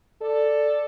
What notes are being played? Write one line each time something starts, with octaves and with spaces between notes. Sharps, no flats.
A4 D5